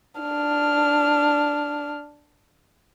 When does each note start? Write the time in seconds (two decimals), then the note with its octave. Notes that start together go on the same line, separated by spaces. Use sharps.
0.20 D4 F6